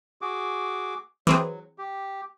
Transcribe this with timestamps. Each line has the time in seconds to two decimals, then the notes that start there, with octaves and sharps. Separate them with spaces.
0.21 F#4 G#4 D6
1.27 E3 F#3 C4 G#4
1.78 G4